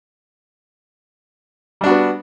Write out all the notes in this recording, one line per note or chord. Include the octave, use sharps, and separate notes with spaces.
G3 B3 D4 F#4